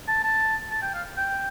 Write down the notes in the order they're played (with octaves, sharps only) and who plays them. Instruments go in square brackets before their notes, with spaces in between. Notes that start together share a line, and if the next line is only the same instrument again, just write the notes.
[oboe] A5
A5
A5
G5
F5
G5